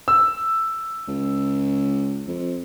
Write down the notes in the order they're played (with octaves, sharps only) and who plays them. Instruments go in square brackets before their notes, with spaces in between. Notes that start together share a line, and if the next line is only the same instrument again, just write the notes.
[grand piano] E6
[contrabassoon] C#2
F2